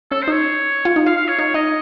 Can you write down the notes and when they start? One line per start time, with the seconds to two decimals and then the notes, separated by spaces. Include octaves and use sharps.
0.11 C#4 A4
0.22 C5
0.28 D#4 C#5
0.85 F4
0.96 D#4
1.06 F4 F5
1.17 F5
1.28 C#5
1.39 D#4 C#5
1.54 D#4 D#5